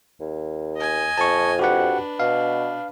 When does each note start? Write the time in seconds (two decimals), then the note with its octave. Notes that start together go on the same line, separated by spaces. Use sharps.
0.20 D#2
0.77 D#5 G#5
1.18 F2 A5 C#6
1.59 D4 F#4 G4 B4 F#5
2.20 B2 F5